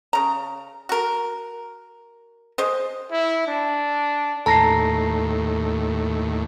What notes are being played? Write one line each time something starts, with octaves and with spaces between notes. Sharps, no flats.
C#3 A#5
F#4 A#4
G#3 C5 D#5
E4
D4
D#2 A2 A4 A5 A#5 A#6 C7